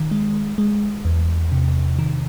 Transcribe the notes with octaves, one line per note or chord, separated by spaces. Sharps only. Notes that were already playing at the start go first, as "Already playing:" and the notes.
Already playing: D#3
G#3
G#3
E2
C3
D#3